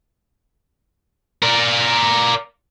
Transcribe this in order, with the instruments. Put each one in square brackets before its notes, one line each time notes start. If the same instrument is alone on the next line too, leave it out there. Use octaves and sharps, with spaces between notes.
[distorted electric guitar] A#4 D5